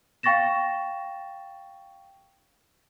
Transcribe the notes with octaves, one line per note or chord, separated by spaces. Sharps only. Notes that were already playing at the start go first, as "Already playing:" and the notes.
F5 G5 C#6 A6 A#6 E7